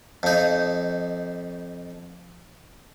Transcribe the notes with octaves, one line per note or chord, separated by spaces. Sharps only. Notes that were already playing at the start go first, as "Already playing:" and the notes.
F2 D#4